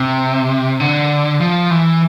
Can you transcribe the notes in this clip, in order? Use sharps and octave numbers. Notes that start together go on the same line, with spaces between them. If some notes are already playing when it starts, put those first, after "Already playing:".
Already playing: C3
D3
F3
E3